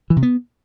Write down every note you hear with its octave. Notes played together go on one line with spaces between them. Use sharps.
E3
C3
B3